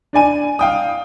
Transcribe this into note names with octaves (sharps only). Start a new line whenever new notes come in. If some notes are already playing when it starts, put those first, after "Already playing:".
D4 D5 G#5 D#7
F5 G5 D#6